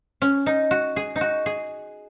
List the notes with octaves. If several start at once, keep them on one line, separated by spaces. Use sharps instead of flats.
C#4
D#4
F#4
G#4
D#4
F#4
G#4